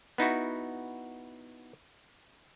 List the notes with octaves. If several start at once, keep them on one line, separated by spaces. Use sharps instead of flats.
B3 D#4 E4 F#4